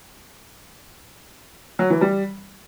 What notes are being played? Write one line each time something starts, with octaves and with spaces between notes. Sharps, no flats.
F#3
E3
G3